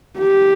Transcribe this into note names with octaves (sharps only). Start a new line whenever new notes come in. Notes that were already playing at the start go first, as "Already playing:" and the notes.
G4